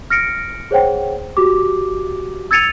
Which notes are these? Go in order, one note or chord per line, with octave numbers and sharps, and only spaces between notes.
F6 A#6 C#7 D7
G#4 C5 C#5 F#5 G5
F#4 G4 D6
E6 G#6 A6 C#7 D#7 F7